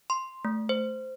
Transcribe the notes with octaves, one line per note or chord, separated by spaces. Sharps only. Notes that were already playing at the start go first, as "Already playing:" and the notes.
C6
A3
C5